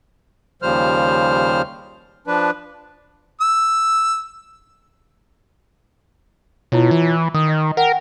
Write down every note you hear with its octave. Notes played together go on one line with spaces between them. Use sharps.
D#2 C#3 F3 G3 C5 F6
F3 D4 B4
E6
B2 E4 F4 C#5
E3
D#3 D#6
D#5
A#4 F#5 G5